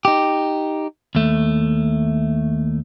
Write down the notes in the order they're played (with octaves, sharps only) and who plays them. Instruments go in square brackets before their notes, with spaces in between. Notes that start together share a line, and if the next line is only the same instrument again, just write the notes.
[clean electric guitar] D#4 G4
D#2 A3